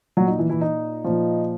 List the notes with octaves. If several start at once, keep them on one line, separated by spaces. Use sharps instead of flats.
A#2 F#3 F#4
D#4
E3 E4
E3 E4
D#4
A#2 F3